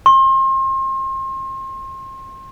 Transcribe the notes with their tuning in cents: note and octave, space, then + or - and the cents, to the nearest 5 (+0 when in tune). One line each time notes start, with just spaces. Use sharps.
C6 +35